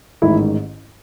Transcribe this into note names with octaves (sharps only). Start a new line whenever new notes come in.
A1 G#2 D#3 E4